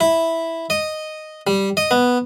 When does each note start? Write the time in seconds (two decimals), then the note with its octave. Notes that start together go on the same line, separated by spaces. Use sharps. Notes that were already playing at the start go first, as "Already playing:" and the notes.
0.01 E4
0.70 D#5
1.47 G3
1.77 D#5
1.91 B3